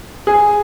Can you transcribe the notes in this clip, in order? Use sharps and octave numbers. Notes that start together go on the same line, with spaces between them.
G#4